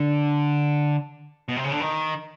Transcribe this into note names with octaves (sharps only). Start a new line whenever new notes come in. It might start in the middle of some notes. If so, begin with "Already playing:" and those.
Already playing: D3
B2
C3
C#3
D3
D#3